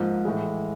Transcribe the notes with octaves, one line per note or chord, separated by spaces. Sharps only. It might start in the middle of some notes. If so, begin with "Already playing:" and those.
Already playing: G#2 F3 A#3
A2 E3 G#3